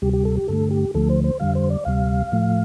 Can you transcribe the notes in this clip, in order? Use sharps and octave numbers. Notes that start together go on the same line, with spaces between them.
D2 C3 G3 G4
G4
A4
G4
G2 D3 A3 A4
G4
D2 D3 F3 A3 A4
C5
C5
F2 D3 G3 F5
C5
D5
D2 C3 G3 F5
A2 F3 A3